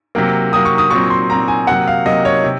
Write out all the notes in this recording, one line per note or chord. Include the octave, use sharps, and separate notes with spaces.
C3 F#3 A#3
C3 F#3 A#3 D#6
C#6
D#6
A#2 F#3 C4 C#6
C6
A#2 F#3 C4 A#5
G#5
C3 F#3 A#3 F#5
F5
C3 F#3 A#3 D#5
C#5
C3